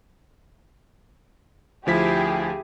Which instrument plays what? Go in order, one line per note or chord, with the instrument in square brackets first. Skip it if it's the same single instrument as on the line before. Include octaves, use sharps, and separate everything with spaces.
[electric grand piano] D2 F3 B6 [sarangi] E4 [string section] G4 G#4